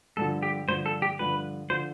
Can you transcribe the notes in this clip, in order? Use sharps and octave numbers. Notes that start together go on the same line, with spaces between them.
G2 D3 F3 A4
G4
G2 D3 F3 C5
A4
G4
G2 D3 F3 B4
D3 F3 C5